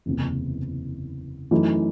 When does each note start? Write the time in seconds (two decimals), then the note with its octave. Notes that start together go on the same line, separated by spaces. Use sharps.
0.06 F#1 E2 C3 E3
1.51 F#2 E3 A3 D#4